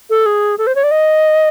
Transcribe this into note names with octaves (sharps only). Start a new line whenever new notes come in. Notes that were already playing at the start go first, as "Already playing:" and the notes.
A4
G#4
A4
C5
C#5
D5
D#5